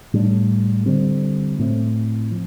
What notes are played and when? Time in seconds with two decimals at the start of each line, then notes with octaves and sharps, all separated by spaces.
0.13 A2 G3 D4
0.86 D3 G3 C4
1.59 A2 A3 C4
2.31 F3